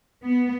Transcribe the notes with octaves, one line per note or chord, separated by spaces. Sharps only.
B3